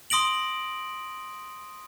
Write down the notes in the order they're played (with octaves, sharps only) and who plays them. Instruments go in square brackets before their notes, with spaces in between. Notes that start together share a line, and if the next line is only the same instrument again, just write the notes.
[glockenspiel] C6 D#6 A#6 D7 F#7